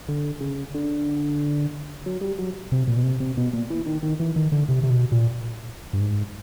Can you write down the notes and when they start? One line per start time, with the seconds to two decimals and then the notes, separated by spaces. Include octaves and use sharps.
0.08 D3
0.41 C#3
0.74 D3
2.06 F#3
2.21 G3
2.39 F#3
2.72 C3
2.88 A#2
2.97 B2
3.03 C3
3.20 C3
3.37 B2
3.53 A#2
3.70 E3
3.86 D#3
4.03 D#3
4.20 E3
4.36 D#3
4.52 D3
4.69 C3
4.83 C3
4.90 B2
5.12 A#2
5.93 G2
6.00 G#2